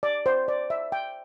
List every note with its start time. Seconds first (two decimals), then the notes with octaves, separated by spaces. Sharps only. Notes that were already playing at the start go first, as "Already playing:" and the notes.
0.03 D5
0.26 C5
0.48 D5
0.70 E5
0.92 G5